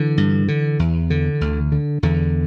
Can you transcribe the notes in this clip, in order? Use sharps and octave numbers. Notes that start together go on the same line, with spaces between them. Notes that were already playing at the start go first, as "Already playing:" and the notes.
Already playing: D3 E3
G2
D3
E2
D3
D2
D3
E2 D3